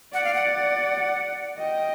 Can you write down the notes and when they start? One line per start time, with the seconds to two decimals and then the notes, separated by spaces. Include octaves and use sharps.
0.14 D5 F#5
0.24 F5
0.34 F#5
1.58 D#5 G5